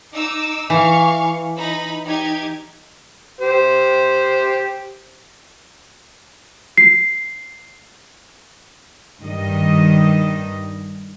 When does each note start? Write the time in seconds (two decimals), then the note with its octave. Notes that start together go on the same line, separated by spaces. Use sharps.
0.15 D#4 D6 E6
0.70 E3 F5 C#6
1.58 D#4 B5 A#6
2.07 D#4 G4 G#6
3.41 G4 C5
6.78 C7
9.21 G2 D#3 G3 D#5